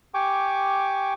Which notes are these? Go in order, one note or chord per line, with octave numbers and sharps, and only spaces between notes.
G4 G5 G#5 C#6 D6